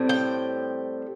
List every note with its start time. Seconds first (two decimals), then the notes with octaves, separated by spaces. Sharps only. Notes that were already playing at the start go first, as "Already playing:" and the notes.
Already playing: A2 G3 C4
0.09 G5